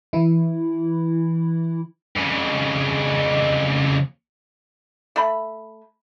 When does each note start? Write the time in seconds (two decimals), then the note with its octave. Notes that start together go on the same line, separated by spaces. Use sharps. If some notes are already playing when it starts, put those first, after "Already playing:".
0.13 E3 E4
2.16 F2 C#3
5.16 A3 B5